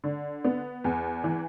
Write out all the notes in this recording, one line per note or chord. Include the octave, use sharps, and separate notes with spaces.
D3
B3
E2
E3